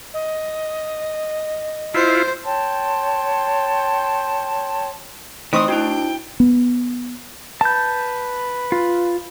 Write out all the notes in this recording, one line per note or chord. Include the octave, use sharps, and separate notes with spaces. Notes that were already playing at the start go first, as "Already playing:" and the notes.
D#5
E4 F4 C5
C#5 G5 A5 C6
E3 A3 C4 D#4 C6 C#6 D#6
D4 E4 F#4 G5
B3
B4 A5 G6
F4